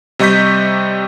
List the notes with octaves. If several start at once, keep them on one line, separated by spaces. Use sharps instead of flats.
C3 G3 D#5 C#6 G6 B6